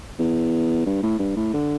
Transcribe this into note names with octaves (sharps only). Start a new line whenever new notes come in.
E2
G2
A2
G2
A2
D3